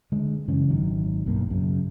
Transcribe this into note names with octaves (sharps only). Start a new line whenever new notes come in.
D3 G#3
F#2 C#3 E3 C#4
G#1 D#3 F#3
B1 G2 A#3
F#2 C#3